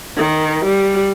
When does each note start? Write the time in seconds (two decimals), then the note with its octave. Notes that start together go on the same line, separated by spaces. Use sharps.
0.17 D#3
0.65 G3